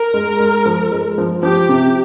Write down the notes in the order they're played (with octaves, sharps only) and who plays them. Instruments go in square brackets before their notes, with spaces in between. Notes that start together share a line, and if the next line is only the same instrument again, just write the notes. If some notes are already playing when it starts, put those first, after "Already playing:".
Already playing: [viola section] A#4
[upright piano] G#3
G#3
F3
G#3
F3
[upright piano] F3 [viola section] G4
[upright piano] C3